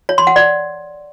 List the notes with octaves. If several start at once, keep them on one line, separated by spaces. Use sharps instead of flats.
C#5
C6
F#5
D5